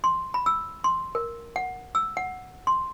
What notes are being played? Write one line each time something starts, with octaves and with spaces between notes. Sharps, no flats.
C6
B5
E6
C6
A#4
F#5
E6
F#5
C6